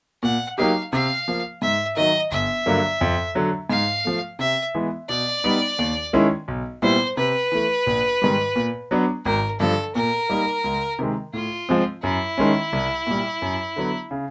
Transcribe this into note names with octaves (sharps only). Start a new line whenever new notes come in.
A#2 F#5
F#3 A#3 D#4 G4 F5
C3 F5
F3 A#3
G#2 E5
D#3 F#3 D#5
G1 E5
G2 D3 F#3 A#3
F2
D3 F#3
G#2 F5
F3 A3
C3 E5
E3 G#3 B3
B2 D5
G3 B3 D#4
D#2
D#3 G#3 C#4 E4
B1
A#2 G3 B3 E4 C5
C3 B4
E3 A3
A#1
G#2 D#3 G3
A#2
F#3 B3 D4
G#1 A#4
G2 D3 F3 A4
A#2 A#4
G3 A#3 D#4
C#2
C3 D#3 G#3
A2 F4
F3 G#3 C4
F#2 E4
D#3 G#3 C#4
C2
A#2 G3
F#2
D3 F#3 B3
C#3